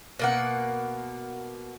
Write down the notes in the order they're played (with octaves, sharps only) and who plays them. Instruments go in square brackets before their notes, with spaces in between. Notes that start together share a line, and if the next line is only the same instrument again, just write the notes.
[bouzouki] B2 A#3 F#5